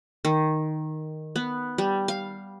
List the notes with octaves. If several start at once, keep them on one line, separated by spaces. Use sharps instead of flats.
D#3
B3
G3
F5